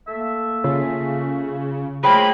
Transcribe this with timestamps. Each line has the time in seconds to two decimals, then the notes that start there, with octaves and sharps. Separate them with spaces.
0.08 A3 A#3 E5
0.64 C#3 F4
2.04 F3 A3 A#3 G#4 C#5 G5 B5 C6